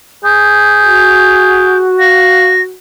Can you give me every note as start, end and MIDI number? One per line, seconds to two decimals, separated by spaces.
0.24 1.90 68
0.24 1.77 91
0.83 2.76 66
1.99 2.49 77
1.99 2.62 94